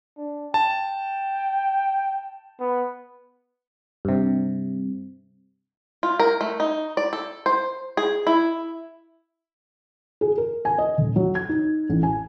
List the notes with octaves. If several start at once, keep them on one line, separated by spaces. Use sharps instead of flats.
D4
G5 A5
B3
G2 C3
F4
A#4
A3
D#4
D5
A4
C5
G#4
E4
G#4
A#4
G#5
D#5
D#1
F#3
G#6
D#4
A1
G#5